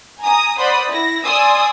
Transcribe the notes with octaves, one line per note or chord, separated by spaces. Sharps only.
G#5 A#5 D#6
C5 D5 F#5 B5 D#6
E4 A#6
D5 G#5 C6 D#6 E6